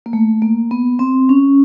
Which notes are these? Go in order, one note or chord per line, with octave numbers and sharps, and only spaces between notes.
A#3
A3
A#3
B3
C4
C#4